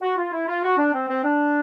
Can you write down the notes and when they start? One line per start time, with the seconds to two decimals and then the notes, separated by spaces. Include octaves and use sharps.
0.02 F#4
0.16 F4
0.32 E4
0.47 F4
0.63 F#4
0.77 D4
0.93 C4
1.08 C4
1.23 D4